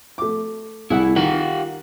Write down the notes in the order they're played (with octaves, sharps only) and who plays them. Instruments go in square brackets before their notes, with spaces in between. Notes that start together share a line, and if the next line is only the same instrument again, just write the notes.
[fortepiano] A3 D6
[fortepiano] C2 G#4 F#5 [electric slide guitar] E4
[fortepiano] D#3 [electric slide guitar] F4 G4 F#5